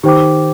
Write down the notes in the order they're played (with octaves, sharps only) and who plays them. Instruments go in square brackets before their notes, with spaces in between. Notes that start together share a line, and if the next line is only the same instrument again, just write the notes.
[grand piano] D#3 [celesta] G4 C5 G5 D6